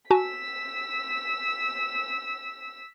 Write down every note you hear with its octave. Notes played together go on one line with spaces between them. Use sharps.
F#4 G#5 A5 E6 B6